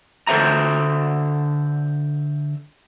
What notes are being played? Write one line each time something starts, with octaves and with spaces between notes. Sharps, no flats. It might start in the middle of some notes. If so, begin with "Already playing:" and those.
D3 A4 C5 E5 A#5